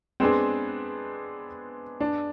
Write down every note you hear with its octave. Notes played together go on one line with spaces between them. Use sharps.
G#3 B3 C4 D4 G#4
D4